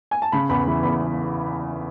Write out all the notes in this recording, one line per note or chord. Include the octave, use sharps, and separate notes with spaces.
G#5
A5
C#3 B5
E2 B5
E3 B5
E2 B5